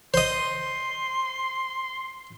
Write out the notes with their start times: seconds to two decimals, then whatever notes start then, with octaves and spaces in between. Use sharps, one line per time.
0.14 C5 D#5 C6